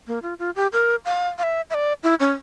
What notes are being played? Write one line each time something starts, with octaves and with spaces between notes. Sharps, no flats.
A#3
F4
F4
G4
A#4
F5
F5
E5
E5
D5
E4
C#4